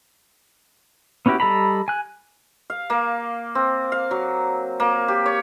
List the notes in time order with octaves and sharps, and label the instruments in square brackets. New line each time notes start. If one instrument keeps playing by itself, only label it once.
[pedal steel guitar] B3 C#4 E4 F#4 G4
G3 A4 D#5 A#5 B5
G#5 F#6
[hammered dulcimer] F5
A#3
C4
F5
F#3
A#3
G4
C#5